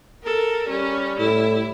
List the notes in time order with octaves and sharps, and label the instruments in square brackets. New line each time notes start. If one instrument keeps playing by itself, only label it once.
[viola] A4 A#4
[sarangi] G3 [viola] C#4
[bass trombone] A2 [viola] E4